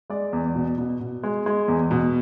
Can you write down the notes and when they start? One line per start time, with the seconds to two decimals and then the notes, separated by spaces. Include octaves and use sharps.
0.10 G#3 D5
0.33 E2
0.55 B2
0.78 B2
1.00 B2
1.23 G#3
1.46 G#3
1.68 E2
1.91 B2